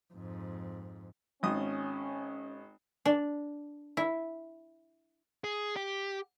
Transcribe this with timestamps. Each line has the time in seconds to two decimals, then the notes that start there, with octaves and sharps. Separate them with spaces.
0.14 F2 G#2
1.43 G#1 C#4 D#6
3.05 D4
3.97 E4
5.44 G#4
5.76 G4